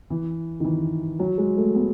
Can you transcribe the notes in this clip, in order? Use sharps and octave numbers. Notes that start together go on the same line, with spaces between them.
E3
D#3
E3
F#3
G#3
A3
B3